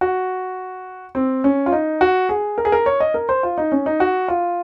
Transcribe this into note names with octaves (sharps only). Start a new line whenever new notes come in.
F#4
C4
C#4
F4
D#4
F#4
G#4
A#4
G#4
A#4
C#5
D#5
A#4
C5
F4
D#4
C#4
D#4
F#4
F4